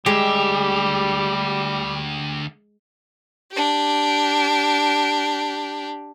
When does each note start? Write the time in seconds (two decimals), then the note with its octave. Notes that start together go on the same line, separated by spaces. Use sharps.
0.06 D2 G3 G#3 G4 E5
3.52 D4 G4